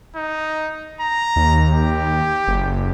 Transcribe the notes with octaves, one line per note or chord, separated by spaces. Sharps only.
D#4
A#5
D#2
G4
F#1